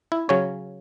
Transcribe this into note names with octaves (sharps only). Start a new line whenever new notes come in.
E4
C#3 F#3 C#4 C#5